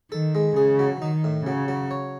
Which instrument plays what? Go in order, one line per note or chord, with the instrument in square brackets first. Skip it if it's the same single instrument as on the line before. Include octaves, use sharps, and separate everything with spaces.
[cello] D#3 [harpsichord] A4
[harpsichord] G#3
[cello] C#3 [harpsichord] G#4
[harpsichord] F#3
[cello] D#3 [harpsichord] D#4
[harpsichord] A2
[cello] C#3 [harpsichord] F#3
[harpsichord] F#3
C#5